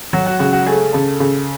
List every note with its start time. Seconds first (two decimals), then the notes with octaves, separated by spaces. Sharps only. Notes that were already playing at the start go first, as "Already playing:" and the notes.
0.13 F#3 F#4
0.26 F#4
0.39 C#3 F#4
0.53 F#4
0.66 A3 G#4
0.93 C#3 A4
1.20 C#3